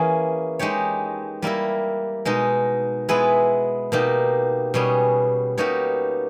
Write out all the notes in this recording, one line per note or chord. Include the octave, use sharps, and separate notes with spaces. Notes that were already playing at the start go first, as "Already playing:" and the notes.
Already playing: E3 A#3 C#4 G#4
G#3 D#4 G4 C#5
G3 A#3 E4 A#4
B2 G#3 D#4
G#3 B3 E4 G#4 B4
B2 A#3 D#4 G4
B2 G3 C#4 G#4
B2 A#3 D#4 G4 C#5